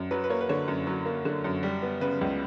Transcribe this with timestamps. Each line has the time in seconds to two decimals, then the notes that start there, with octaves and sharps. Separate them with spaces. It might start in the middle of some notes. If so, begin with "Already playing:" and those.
Already playing: F#2
0.11 F#3 B4
0.24 B4
0.30 A#3 C#5
0.41 B4
0.49 D3 C#5
0.68 F#2
0.87 F#3
1.06 A#3
1.25 D3
1.44 F#2
1.63 G3
1.82 B3
2.01 C#3 B4
2.21 C#2